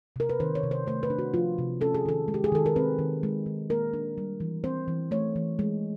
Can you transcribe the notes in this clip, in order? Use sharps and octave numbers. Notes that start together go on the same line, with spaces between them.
C3 A#4
B4
D#3 C5
C#5
C3
C5
A3 C5
B4
D4
F#4
F3 F4
C3
C#4 A4
G#4
D#3 A4
G#3
G4
G#4
D#3 A4
A#4
C4 B4
D#3
G#3
D#3
A#3 A#4
D4
G3
E3
C4 C5
E3
A3 C#5
E3
G#3